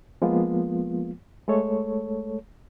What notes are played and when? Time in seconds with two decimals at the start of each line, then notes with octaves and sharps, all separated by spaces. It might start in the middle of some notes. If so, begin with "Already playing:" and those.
0.22 F3 G#3 A#3 B3 F4
1.48 G#3 A3 A4 C#5